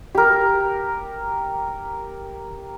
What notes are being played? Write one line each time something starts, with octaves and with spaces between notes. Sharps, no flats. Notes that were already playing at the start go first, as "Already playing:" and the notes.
G4 A#4